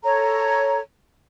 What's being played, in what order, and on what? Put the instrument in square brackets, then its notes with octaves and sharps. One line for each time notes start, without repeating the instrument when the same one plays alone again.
[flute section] A4 C#5 A#5